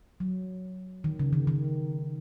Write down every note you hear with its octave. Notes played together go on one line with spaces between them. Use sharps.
F#3
D#3
C#3
D#3
D#3